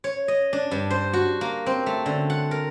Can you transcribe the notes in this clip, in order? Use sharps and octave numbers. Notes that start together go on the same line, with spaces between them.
C#5
D#5
D4
G2
C5
F#4
A#3
C4
A3
D3
F#5
A#4